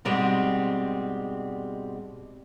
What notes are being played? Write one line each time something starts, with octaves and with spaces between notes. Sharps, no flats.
G#2 B2 G3 G#3 C4